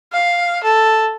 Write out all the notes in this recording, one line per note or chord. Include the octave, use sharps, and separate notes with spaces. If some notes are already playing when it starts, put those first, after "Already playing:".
F5
A4